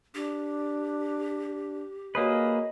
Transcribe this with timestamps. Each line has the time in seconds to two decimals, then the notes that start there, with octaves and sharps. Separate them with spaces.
0.15 D4 G4
2.15 A#3 F#4 G#4 B4 C#5 D#5 D#6